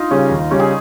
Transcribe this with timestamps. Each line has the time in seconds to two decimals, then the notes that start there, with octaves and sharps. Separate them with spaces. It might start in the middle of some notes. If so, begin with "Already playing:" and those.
Already playing: D#4 F4
0.11 C#3 G3 C#4
0.31 D#2
0.51 C#3 G3 C#4
0.60 G#4